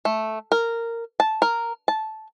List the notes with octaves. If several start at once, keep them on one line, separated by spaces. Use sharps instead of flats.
A3
A#4
A5
A#4
A5